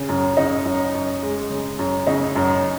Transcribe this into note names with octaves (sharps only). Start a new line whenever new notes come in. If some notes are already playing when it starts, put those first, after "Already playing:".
Already playing: C#3
F#2
C#3 D#4
F#2
F#2
G#3
C#3
F#2
C#3 D#4
F#2